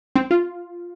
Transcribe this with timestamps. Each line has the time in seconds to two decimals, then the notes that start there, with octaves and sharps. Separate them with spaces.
0.16 C4
0.31 F4